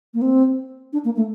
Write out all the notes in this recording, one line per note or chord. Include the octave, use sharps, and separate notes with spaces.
A#3
C4
D4
A#3
A3